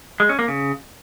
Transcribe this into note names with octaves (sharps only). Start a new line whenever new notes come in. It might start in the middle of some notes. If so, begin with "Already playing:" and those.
G#3
C#4
A#3
C#3